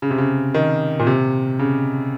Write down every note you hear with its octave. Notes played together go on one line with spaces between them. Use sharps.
C#3
C3
C#3
D#3
A#2
C3
C#3